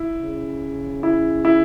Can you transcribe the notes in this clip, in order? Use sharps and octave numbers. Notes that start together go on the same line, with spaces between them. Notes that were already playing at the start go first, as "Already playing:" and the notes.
Already playing: E4
C#3
E4
E4